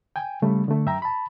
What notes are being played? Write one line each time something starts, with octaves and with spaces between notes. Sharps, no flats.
G5 G#5
C#3 G3 A3
D3 A3
F#2 E5 G5 A#5
A5 B5